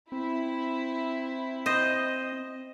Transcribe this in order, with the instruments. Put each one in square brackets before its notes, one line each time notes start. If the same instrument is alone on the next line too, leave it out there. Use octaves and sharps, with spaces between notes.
[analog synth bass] C4 [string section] E4
[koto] C5 D#5